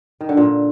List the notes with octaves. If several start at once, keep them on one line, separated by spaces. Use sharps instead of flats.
D#3
D3
A#2